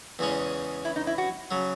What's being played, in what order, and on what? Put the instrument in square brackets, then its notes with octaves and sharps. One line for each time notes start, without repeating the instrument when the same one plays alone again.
[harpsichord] E2 C#3 G#3 C#4
[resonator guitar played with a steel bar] E4
D#4
E4
F#4
[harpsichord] C#3 F#3